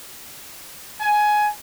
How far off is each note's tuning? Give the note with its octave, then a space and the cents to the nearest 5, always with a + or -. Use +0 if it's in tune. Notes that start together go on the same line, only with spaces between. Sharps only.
G#5 +15